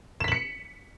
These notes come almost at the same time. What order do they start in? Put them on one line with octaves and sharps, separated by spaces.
E7 B6 F#7 C#7